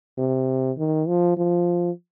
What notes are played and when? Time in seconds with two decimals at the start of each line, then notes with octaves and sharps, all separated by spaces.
0.18 C3
0.78 D#3
1.08 F3
1.37 F3